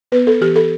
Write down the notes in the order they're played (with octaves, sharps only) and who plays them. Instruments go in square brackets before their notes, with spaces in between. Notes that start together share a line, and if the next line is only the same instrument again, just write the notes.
[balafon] B3 B4
A4
E3 G4
A4